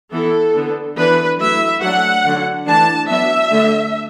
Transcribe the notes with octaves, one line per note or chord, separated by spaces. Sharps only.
E3 B3 E4 A4
D3 B3 D4
E3 B3 D4 B4
F#3 A3 E4 E5
F#3 A3 D4 F#5
D3 F#3 D4
E3 A3 D4 A5
F#3 B3 D4 E5
D3 A3 D4